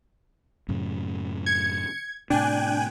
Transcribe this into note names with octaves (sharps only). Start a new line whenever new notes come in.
F#2 A2 C#3
G#6 C#7
A2 C3 D4 G5 G#5 F#6